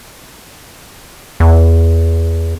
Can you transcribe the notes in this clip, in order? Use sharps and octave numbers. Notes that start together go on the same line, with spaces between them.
E2